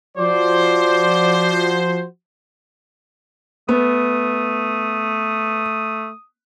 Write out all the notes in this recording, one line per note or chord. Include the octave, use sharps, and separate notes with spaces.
F3 F#4 C5 D5
A3 B3 D#6